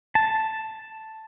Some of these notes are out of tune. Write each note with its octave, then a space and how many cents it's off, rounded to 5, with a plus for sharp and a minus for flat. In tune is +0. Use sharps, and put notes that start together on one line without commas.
A5 +0